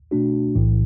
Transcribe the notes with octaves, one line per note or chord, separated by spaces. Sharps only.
B2 A3 D4 F#4
B1 A2 E3